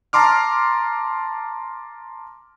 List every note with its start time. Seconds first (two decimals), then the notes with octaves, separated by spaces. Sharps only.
0.13 A5 A#5 C6 D6 F6